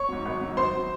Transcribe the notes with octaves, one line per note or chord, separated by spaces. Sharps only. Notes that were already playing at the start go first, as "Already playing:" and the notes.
Already playing: C#5 C#6
G#2 F#3
G#1
G#2 F#3
G#1 C5 C6
F#3